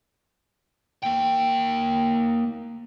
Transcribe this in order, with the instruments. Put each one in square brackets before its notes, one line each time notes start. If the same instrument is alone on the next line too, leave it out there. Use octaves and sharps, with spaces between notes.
[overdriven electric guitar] A#3 G5